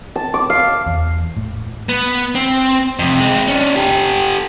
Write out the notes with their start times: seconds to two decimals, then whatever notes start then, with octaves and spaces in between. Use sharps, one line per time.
0.16 A5
0.34 D6
0.50 F5
0.86 E2
1.37 A2
1.89 B3
2.35 C4
2.99 F2 C3
3.20 G#3 C4
3.48 C#4 D4
3.76 G4 A4